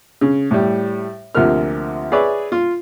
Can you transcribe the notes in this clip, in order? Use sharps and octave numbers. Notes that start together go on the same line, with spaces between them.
C#3
A2 G3
D2 C3 F3 A#3 F6
G#4 B4 C#5 D5 E5
F4